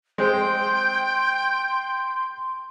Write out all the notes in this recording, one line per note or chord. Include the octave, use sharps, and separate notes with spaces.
G#3 C4 G5 C6